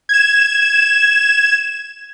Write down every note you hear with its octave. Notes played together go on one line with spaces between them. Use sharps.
G#6 E7